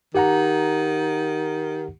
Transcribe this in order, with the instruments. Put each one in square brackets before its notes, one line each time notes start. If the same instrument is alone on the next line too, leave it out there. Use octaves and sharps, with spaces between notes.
[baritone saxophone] D#3 [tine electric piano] G4 F#5 A#5